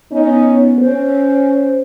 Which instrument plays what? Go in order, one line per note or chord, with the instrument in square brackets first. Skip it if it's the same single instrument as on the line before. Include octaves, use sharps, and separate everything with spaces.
[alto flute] B3 [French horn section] C#4 D#4
[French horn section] C#4 [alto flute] C5